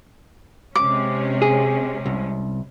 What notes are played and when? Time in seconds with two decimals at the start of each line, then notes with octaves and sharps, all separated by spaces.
0.75 C3 G#3 C#4 D6
1.42 G#4
2.06 C2